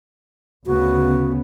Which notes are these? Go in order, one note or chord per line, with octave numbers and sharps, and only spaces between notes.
D2 C#3 B3 F#4